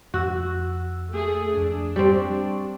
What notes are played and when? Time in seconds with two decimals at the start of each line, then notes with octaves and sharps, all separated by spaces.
0.14 F2 F#4 E6
1.11 A3 G#4
1.57 F2 D4
1.96 G3 C4 C#6